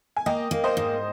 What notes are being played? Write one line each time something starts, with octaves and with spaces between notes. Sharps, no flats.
G#5
A#3 D#5 G5
A#3
C5 D#5
G#2